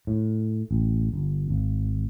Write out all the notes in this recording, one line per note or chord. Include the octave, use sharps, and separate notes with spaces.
A2
A1
G1
G#1